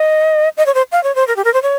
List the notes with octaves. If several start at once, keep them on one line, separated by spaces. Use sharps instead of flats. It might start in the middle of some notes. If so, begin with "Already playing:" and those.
Already playing: D#5
D#5
C#5
C5
F5
C#5
C5
A#4
G4
A#4
C5
C#5